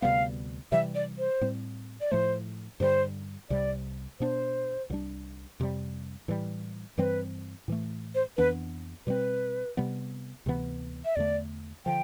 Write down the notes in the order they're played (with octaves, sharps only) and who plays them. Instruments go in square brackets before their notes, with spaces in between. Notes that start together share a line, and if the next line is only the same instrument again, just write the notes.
[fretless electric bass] D2 C3 G3 B3 [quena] F5
[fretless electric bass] C3 E3 G3 [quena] E5
[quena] D5
C5
[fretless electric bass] A2 G3 C4
[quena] D5
[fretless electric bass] A2 F3 A3 [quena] C5
[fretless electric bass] G2 D3 G3 [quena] C5
[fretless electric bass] C2 C3 G3 [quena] D5
[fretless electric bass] B2 B3 D4 [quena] C5
[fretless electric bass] C2 B2 G3 D4
F2 C3 G3
A2 E3 G3
[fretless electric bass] G2 E3 G3 C4 [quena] B4
[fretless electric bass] A2 E3 A3
[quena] C5
[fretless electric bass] F2 E3 B3 D4 [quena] B4
[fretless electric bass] B2 G3 C4 [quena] B4
[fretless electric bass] C3 G3 B3
D2 C3 E3 B3
[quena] E5
[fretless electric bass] E2 D3 A3 [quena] D5
[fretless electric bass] D3 F3 [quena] G5